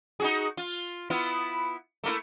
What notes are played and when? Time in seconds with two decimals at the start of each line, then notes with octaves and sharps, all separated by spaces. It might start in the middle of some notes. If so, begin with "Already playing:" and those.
0.20 D#4 F#4 G#4
0.57 F4
1.10 B3 E4 F4
2.04 A3 A#3 E4